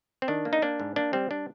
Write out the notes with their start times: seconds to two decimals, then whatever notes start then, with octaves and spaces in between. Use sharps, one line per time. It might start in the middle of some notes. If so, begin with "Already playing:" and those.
0.22 C4
0.28 D#3 D4
0.45 A#3
0.53 D#4
0.62 A#3 D4
0.80 G#2
0.96 A#3 D4
1.13 G3 C4
1.31 G3 D4